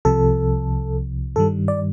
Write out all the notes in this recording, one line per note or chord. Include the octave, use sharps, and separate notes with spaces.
C2 C3 F3 A4
G2 D#3 G3 A4
D5